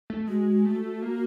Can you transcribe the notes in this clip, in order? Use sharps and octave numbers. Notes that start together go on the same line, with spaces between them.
A3
G#3 F#4
A3
A#3